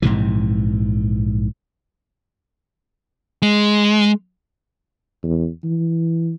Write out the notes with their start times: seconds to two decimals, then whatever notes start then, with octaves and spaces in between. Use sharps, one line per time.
0.02 A#1 G#2 C3 E3
3.42 G#3
5.23 E2
5.64 E3